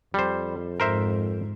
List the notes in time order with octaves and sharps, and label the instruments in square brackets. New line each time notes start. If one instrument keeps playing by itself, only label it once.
[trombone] F2 [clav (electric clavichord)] G3 C5
[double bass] G#2 [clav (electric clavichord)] A#4 C5 E5